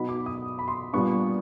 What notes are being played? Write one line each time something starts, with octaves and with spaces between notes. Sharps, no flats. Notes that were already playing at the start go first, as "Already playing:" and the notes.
Already playing: B2 F#3 B3 D#4 B5
D6
D#6
B5
C6
A#2 G3 B3 D4 C#6